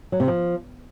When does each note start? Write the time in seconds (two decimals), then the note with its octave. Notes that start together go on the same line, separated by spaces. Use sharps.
0.12 F#3
0.20 C3
0.28 F3